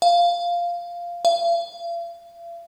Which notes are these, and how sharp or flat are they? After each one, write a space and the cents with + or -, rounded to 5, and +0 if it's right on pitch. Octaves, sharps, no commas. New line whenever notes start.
F5 -5
F5 -45